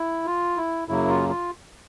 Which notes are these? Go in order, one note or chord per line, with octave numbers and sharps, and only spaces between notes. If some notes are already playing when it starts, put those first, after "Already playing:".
Already playing: E4
F4
E4
F#2 C#3 F#3 A#3 E4
F4
F4